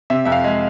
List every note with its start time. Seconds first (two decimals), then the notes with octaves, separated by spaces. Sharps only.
0.10 C3 E5
0.25 F2 E5
0.32 F5
0.44 G#3